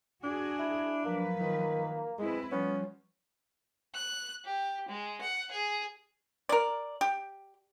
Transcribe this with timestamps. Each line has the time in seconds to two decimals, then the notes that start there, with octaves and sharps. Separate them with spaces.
0.24 D4 F#4 G#4
0.59 E4
1.05 F3 F#3 A#3 B4
1.40 D#3
2.19 G#3 C4 E4 B4
2.52 F3 G3 B3 C#4
3.95 F#6
4.45 G4
4.89 G#3
5.21 F#5
5.52 G#4
6.49 A#4 D5
7.01 G4